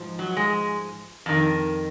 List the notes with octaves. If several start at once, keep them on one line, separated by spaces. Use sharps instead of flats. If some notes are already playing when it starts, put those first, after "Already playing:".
Already playing: G#2 F3
F#3
G#3
F2 D#3